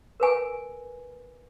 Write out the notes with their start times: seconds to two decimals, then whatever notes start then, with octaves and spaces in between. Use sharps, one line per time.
0.20 A#4 B4 G#5